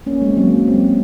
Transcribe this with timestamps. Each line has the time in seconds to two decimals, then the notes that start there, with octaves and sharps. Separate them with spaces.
0.06 A#3 C#4
0.22 G#3
0.31 C4
0.37 F#3 A#3
0.68 G#3 C4